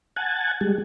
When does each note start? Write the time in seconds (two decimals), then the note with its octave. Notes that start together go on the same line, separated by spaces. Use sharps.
0.16 F#5 G#5 A5
0.61 G3 G#3